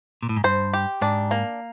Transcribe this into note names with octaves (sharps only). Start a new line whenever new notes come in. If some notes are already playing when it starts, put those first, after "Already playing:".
A#2
A2
G#2
G2 C5
G4
G#2 D4
A#3